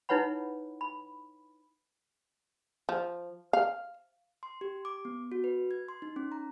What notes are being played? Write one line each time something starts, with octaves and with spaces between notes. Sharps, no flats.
D#4 E4 B4 C#5 F#5 B5
B5
F3
F5
C6
G4
D6
B3
F#4
B4
G#6
C6
D#4
C#4
A#5